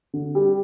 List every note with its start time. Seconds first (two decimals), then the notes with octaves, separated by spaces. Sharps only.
0.13 D3
0.35 G3